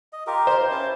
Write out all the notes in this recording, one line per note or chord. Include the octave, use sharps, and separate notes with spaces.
D#5
F4 G4 A#4
C5
C#4 E4 A5